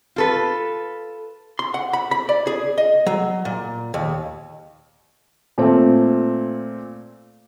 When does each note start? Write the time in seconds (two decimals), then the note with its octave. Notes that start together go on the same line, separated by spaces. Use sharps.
0.16 F4 A4 B4
1.59 C6
1.74 F#5
1.93 B5
2.11 B5
2.29 D5
2.47 G#4
2.78 D#5
3.07 F#3
3.45 A#2
3.94 D#2
5.58 A#2 A3 C4